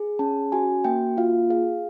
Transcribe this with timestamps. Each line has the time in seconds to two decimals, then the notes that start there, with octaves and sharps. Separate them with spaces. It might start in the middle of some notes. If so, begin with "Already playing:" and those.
Already playing: G#4
0.19 C#4 A5
0.52 F#4 G#5
0.84 A#3 G5
1.17 F4 F5
1.50 G#4 F5